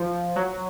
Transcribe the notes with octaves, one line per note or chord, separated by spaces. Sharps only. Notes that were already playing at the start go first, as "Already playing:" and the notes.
Already playing: F3
F#3